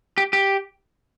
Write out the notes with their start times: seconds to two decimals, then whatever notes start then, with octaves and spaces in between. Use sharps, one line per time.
0.18 G4
0.33 G4